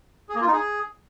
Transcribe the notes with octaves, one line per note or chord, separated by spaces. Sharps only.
G#4
A#3
F4
D#4
G#4